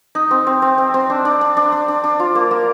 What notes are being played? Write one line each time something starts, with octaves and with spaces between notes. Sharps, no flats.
D#4
C4
C4
C4
C4
C4
D4
D4
D4
D4
D4
D4
D4
F4
A#3
A#3